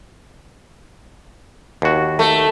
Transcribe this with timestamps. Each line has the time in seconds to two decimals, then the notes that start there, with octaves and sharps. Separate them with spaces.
1.82 D#2 F#4
2.19 A3